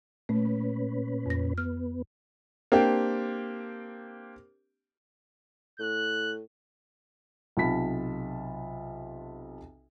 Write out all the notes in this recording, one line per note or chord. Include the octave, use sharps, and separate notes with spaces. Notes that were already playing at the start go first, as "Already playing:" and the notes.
A#2 A3 C#4 B4
F2 A#6
B3 F6
A#3 C4 D4 G4 C5
A2 F#6
B1 C3 F4 A5 B5 B6